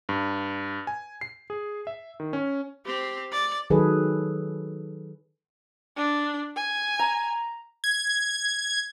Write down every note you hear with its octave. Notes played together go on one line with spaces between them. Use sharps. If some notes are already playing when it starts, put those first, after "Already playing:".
G2
G#5
C7
G#4
E5
D#3
C#4
C4 G4
D5
D#3 F#3 G#4 A4 B4
D4
G#5
A#5
G#6